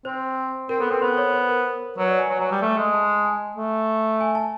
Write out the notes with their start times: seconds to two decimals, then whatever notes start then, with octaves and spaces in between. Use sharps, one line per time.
0.05 C4 C5
0.69 C4 A#4
0.80 B3 A4
0.91 C4 B4
1.02 B3 C5
1.17 C#5
1.33 C5
1.49 A#4
1.98 F#3 B4
2.08 D5
2.19 G#5
2.29 F#3
2.40 F#3
2.51 G3
2.61 A3
2.77 G#3
2.93 A5
3.25 G#5
3.57 A3
4.21 G#5
4.35 A5